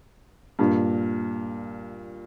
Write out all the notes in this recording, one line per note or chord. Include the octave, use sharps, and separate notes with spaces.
G2 A#2